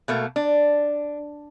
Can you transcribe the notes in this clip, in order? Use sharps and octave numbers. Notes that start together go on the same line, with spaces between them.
B2 A3 A#3
D4